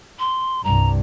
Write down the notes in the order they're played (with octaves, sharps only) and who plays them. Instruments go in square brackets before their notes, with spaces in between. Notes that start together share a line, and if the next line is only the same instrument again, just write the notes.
[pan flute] C6
[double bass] C2 G2 [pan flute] A#5